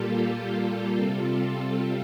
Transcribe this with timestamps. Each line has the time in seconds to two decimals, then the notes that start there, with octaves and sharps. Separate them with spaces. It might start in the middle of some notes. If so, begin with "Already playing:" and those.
Already playing: A#2 G3 A#3 F4 G4 A4
0.51 G4
0.96 C3 G3 C4 F4 A4